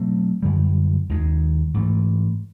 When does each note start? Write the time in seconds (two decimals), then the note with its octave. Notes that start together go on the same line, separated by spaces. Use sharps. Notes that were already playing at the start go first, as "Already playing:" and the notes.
Already playing: B2 F#3 A3 C4
0.43 F#2 D3 G3
1.09 D#2 D#3 G#3
1.74 G#2 E3 A3